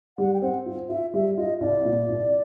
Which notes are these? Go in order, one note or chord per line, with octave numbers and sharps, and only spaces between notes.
G3 F#5
G5
C4 F#5
F4
F4 E5
G3 E5
F4 D#5
C2 D5
A#2
C2